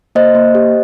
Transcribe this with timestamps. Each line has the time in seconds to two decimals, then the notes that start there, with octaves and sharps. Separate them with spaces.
0.15 A#3 C5 D#5
0.35 A#3
0.55 G4